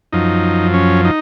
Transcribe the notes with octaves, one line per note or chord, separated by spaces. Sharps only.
F#2 F3 D#4
C#4
D#4